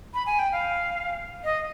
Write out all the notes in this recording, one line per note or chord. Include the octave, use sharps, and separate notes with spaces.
B5
G#5
G5
F5
D#5